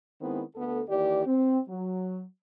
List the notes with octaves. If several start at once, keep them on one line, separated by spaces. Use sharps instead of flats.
D#3 G#3 B3 C4 E4
D2 B3 A4
D#2 E3 G4 D5
C4
F#3